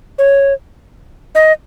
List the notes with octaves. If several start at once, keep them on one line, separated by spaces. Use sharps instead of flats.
C#5
D#5